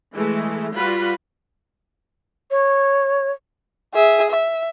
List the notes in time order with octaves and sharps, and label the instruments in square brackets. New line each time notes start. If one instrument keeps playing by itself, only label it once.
[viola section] E3 G#3 A3
G3 F4 F#4 B4 B5
[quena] C#5
[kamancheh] G#4 E5
E5